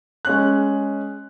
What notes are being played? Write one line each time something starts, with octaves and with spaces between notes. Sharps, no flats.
G#3 C#4 F#6